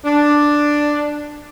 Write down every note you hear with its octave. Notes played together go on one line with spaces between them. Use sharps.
D4